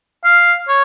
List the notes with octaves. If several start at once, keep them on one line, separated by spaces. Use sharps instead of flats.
F5
C#5